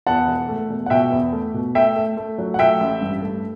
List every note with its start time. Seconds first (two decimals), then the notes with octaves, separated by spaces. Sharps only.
0.07 E2 F#5 A5
0.27 E1
0.49 A3
0.70 E1
0.86 F#5
0.90 B2 E5 G5
1.12 E2
1.33 A3
1.54 B2
1.75 A3 E5 G5
1.96 A3
2.17 A3
2.38 F#3
2.54 F#5
2.59 A3 E5 G5
2.81 A1
3.01 G2
3.22 A3